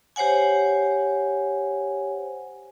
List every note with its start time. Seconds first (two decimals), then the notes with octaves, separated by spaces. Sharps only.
0.16 G4 C5 C#5 F#5 G#5